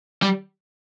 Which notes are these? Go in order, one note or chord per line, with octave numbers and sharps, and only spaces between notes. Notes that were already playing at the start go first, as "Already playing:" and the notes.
G3